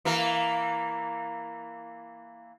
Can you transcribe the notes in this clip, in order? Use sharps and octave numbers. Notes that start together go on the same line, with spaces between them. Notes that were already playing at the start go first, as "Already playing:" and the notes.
E3 A#3 A#4